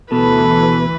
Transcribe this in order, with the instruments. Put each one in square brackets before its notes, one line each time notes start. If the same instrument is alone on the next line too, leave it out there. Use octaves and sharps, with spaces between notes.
[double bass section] D2 E3 [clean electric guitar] B2 [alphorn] A4 [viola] B4